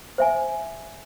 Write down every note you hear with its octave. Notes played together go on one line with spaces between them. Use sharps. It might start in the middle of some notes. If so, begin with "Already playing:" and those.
C5 E5 G#5